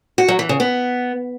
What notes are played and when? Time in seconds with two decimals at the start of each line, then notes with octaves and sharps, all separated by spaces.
0.18 F#4
0.28 F#3
0.39 E3
0.49 C#3
0.60 B3